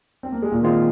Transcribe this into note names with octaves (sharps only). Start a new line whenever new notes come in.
C4
A#3
G#3
A#2 A#3
D#3 G#3 C4 F4 C5